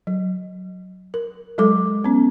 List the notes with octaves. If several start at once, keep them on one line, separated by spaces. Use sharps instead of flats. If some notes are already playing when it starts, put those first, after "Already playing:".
F#3
A#4
F#3 G#3 A4 D6
B3 C#4